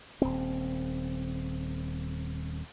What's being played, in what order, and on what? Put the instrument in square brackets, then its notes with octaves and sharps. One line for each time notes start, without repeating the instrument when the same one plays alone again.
[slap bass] D#1 C4